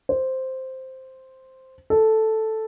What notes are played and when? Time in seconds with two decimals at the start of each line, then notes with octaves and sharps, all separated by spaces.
0.09 C5
1.90 A4